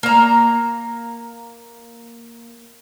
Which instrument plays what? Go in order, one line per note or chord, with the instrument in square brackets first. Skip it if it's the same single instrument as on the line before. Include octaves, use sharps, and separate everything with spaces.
[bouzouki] A#3 A#5